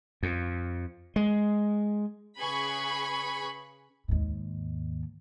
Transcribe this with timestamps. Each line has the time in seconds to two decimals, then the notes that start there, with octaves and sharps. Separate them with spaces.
0.23 F2
1.16 G#3
2.39 C#3 G#4 B4 B5 C#6
4.08 D#2 G#2